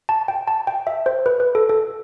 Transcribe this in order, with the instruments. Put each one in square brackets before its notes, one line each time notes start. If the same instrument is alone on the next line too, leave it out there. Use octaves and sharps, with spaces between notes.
[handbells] A5
G5
A5
G5
E5
C5
B4
B4
A4
A4